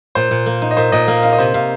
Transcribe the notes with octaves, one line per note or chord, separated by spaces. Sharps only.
A#2 C5
A#2
A#3
D#4
D#5
A#2 C5
A#2 D#5
A#3 F5
D#4 F5
D#5
C3 C5
C3 F5